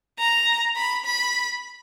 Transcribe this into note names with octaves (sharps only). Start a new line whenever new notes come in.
A#5
B5
B5